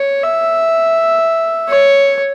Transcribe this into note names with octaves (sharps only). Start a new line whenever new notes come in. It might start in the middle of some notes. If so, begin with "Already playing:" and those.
Already playing: C#5
E5
C#5